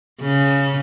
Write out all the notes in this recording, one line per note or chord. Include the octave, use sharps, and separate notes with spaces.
C#3